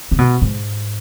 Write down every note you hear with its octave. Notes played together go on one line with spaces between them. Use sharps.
C#3
B2
G#2